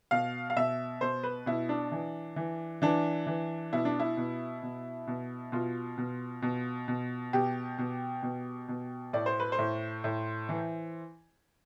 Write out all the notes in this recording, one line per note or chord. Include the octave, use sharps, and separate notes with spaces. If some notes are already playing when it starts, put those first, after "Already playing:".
B2 F5
F5
B2 E5
B2 C5
B4
B2 E4
D4
E3
E3
E3 D4
E3
B2 E4
D4
E4
B2
B2
B2
B2 F4
B2
B2
B2
B2 G4
B2
B2
B2
A2 D5
C5
B4
C5
A2
A2
E3